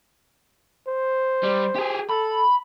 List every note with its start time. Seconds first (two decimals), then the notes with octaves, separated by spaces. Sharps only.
0.88 C5
1.43 G3
1.75 G4 G#4
2.10 A4 B5